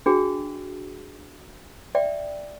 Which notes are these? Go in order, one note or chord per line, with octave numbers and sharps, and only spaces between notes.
D4 F#4 G#4 G5
D5 E5 G5